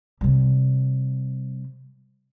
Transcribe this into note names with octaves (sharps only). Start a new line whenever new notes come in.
C3 G3